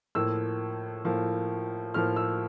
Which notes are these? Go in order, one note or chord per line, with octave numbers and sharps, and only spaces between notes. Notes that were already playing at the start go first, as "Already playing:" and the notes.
A2 F3 A#3 E6
A2 F3 A#3
A2 F3 A#3 F6
E6